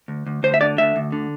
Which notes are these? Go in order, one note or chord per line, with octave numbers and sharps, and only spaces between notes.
D2
D2
D2 C5
E5
D3 D5
D2 E5
D2
D3